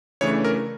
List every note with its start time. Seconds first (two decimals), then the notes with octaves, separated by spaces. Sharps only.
0.21 C#3 E3 A3 D4 C#5
0.45 A#4